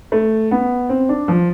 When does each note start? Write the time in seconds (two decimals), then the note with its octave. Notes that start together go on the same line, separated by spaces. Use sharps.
0.12 A3
0.51 B3
0.89 C4
1.09 D4
1.28 F3